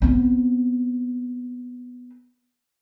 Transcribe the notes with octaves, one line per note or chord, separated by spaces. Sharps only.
B3 C4